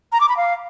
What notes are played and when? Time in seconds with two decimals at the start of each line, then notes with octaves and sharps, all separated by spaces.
0.12 A#5
0.21 D6
0.29 B5
0.37 F5